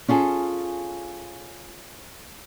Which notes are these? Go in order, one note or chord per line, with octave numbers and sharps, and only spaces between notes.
C#4 F4 G#4 A4